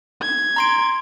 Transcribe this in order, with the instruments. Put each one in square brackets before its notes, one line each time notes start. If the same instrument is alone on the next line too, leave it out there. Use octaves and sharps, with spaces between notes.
[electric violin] G#6
[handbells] A#5 C6 D7